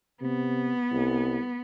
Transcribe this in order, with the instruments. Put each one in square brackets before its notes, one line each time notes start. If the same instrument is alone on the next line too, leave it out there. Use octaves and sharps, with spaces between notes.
[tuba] C3 [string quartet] B3
[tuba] C2